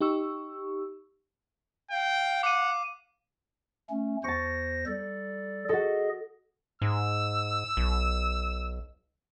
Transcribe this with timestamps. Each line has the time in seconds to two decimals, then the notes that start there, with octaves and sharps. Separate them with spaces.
0.01 D#4 G4 C#6 E6
1.91 F5 G5
2.43 F#5 D6 D#7
3.90 A3 C#4
4.24 E2 C5 A5 C#6 A#6
4.87 G3 A4 D5
5.69 F#4 G#4 A4 D#5
6.82 G#2 E6
7.77 B1